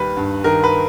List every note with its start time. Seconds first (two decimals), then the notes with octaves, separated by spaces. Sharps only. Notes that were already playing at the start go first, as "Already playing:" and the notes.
Already playing: D#2 G3 B4
0.17 G2
0.44 D#3 A#4
0.64 B4